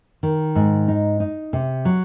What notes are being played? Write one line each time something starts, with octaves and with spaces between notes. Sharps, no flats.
D#3
G#2
D#4
D#4
C3
F#3